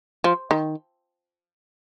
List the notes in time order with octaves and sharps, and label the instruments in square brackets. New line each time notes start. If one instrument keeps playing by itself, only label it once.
[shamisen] F3
D#3